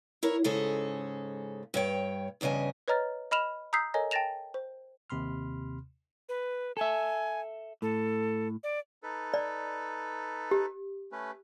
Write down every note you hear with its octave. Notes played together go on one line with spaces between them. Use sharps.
E4 A#4 C#5
G#2 C#3 G#3 G#4 A4
G2 C#5 G5
E2 G2 C#3 D#5 G#5
B4 C#5 D#5 A#5 F6 A6
D#5 B5 F6 E7 F7
A#5 D#6 E6 G6 B6 C7
A4 A#4 C#5 D#5 G#5 A#5
G5 A5 A6 A#6 E7 F7
C5
D#2 C3 B5 C6 F6
B4
A4 E5 G#5
A2 A4
D5
D#4 A4 B4
D5
G4
A3 C#4 B4